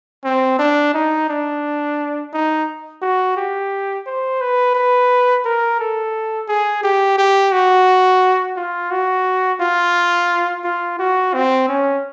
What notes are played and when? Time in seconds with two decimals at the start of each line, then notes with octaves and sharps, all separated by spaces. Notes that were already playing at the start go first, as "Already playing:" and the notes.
0.24 C4
0.59 D4
0.94 D#4
1.29 D4
2.33 D#4
3.02 F#4
3.37 G4
4.07 C5
4.41 B4
4.75 B4
5.45 A#4
5.80 A4
6.48 G#4
6.83 G4
7.18 G4
7.52 F#4
8.57 F4
8.91 F#4
9.61 F4
10.64 F4
10.99 F#4
11.34 C4
11.69 C#4